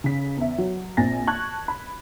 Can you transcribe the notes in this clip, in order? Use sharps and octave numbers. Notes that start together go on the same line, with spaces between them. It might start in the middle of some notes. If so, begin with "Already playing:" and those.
C#3 B6
E2 E5
F#3
A#1 C4 G#5 A6 A#6
A5 C#6 F#6 G#6
B5